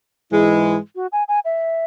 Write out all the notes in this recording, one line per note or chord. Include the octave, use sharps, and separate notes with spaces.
G#2 E3 G#3 E4
F#4
G#5
G#5
E5